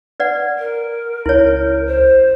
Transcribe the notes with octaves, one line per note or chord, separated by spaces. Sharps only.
B4 D5 F#5
A#4
C#2 E4 C#5
C5